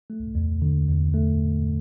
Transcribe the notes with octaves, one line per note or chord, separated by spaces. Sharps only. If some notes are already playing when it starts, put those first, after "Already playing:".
A3
E2
D3
E2
A3
E2